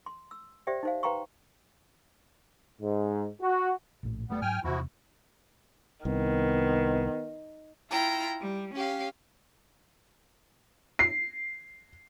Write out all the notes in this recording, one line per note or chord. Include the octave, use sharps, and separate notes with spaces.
C6
E6
G4 C5 D5 E5 G5
D#4 C5 F5
B4 F5 G5 A#5 C6 C#6
G#2
F#4
A#1 A2
F1 G3 A3 B3
G#2 F#3 G5 G#5 F6
E2 C3 F3 E4 F#4
C2 D#3 B3
E4 F4 G5 A#5
G3
C#4 G4 F5
C7